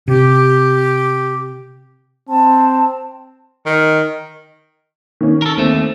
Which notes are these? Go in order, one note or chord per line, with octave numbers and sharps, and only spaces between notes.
C3 G4
C4 A5
D#3
D#3 C#4
A4 A#4
D#2 A3 C4